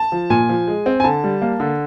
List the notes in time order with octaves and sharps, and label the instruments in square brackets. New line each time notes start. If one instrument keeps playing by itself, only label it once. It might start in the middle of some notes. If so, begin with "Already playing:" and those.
Already playing: [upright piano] A5
[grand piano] F3
[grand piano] A#2 [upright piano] G#5
[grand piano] F3
G#3
C4
[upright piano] G#5
[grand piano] D3 [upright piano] A5
[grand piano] G3
A#3
D3